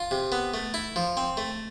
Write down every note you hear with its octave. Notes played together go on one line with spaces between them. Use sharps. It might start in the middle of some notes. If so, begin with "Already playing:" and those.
Already playing: F4
C3
B3
A3
E4
F3
C4
A3